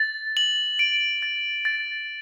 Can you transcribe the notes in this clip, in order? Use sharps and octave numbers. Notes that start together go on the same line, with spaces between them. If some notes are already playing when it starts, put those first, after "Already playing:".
Already playing: A6
F#7
D7
A6
A6